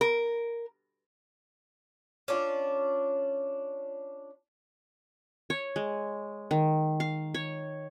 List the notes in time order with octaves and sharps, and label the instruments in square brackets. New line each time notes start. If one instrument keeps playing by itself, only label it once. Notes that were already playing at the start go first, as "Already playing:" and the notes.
[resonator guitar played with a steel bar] A#4
[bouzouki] C#4 D4 F4
[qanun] C#5
G#3
D#3
F5
C#5